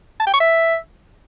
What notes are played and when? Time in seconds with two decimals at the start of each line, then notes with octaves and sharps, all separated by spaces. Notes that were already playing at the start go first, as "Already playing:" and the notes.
0.20 A5
0.27 G5
0.34 C#6
0.40 E5